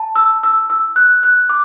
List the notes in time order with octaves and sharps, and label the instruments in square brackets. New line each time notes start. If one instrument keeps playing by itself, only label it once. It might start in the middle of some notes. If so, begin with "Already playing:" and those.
Already playing: [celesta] A5
E6
E6
E6
F#6
F#6
D6